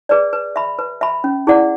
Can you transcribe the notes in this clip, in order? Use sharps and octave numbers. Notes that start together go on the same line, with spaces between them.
G#4 B4 D5
B4
E5 B5
B4
E5 B5
C#4
E4 G#4 D5 F#5